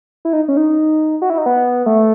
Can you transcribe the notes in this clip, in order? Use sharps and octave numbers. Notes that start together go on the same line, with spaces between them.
E4
D#4
C#4
D#4
F#4
E4
D#4
B3
A3